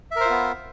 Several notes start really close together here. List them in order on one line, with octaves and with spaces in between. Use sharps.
E5 A#4 C5 F4 B3